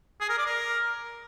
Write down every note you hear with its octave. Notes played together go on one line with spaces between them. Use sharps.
G#4
A#4
D5
A#4